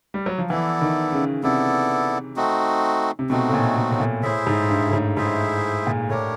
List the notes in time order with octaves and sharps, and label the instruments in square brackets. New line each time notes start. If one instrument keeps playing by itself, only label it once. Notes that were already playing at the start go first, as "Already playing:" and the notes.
[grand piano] G3
F#3
F3
[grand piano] E3 [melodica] B3 E4 A4 D5
[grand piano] D#3
C#3
[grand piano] C3 [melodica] B3 E4 A4 D5
[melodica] A3 C4 D#4 F#4
[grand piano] C3
[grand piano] B2 [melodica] A3 C4 D#4 F#4
[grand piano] A2
A#2
A#2
A2
A#2
[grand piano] A2 [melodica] E4 G#4 C5 E5
[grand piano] G#2
G2
A2
G#2
[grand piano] G#2 [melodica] E4 G#4 C5 E5
[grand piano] A#2
[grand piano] A2 [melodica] D4 G4 A#4 C#5